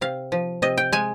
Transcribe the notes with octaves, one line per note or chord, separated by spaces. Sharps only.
C3 F5
F3
C3 D#5
G5
G#3 G#5